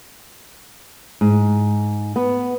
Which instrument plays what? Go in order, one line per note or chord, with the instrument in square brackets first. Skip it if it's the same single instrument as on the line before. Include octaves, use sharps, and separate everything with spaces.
[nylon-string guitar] G#2
B3